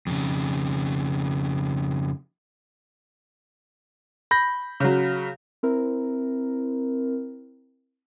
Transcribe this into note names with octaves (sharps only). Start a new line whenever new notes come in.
F2 C#3
B5 G6 A#6
C#3 F#3
C4 E4 A#4